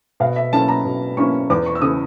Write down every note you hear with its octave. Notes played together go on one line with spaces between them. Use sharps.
B2 F5
E5
F#3 A#3 C#4 E4 A5
A#5
B2
F#3 A#3 C#4 E4 C#6
E2 D6
C#6
E6
C#3 E3 D#6